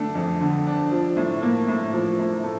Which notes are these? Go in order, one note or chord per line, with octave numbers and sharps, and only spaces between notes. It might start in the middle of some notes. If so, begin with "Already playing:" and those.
Already playing: D3 A3 D4
F2
D3
D4
F3
A2
A#3
A2
F3
A2
A3